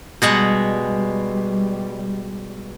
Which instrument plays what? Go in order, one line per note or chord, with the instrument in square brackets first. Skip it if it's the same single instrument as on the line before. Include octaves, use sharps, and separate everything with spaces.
[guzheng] B2 G#3 F#5 [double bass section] G3